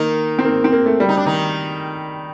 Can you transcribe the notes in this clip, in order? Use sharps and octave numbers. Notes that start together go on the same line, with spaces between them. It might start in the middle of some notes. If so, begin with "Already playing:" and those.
Already playing: D#3 A#3 D#4
C4
A#3
C4
A#3
A3
G3
D#4
D4
D#3 D#4